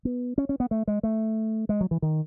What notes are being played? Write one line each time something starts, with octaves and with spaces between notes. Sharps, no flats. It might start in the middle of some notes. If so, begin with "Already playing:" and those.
B3
C#4
C#4
B3
A3
G#3
A3
G#3
F#3
E3
D#3